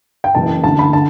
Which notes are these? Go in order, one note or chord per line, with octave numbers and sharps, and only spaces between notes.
G5
F#1 F#2 E3 A5
D2 D3 A5
B5
D3 A5